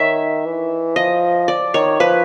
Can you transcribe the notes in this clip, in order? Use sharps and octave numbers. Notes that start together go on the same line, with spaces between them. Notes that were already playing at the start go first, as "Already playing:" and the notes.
Already playing: D#3 C#5 E5
E3
F3 D#5
D5
D#3 C#5
F3 B4